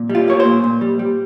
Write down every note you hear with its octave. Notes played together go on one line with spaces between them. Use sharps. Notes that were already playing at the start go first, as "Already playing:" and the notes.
Already playing: A#2
G3
F4
A#3 C#5
C5
A#2
A#2
G3
G3